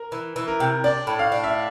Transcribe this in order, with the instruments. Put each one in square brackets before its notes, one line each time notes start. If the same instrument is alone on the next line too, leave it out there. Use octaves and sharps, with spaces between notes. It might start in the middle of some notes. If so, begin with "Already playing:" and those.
Already playing: [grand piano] A#4
[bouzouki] E3
E3
[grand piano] A#4
[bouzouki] C3
[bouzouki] D4 [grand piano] D5
[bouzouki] A2
[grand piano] F5
[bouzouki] D4
[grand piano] E5